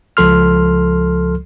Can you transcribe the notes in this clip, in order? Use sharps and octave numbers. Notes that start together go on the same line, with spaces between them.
C#2 F3 A4 C6 F6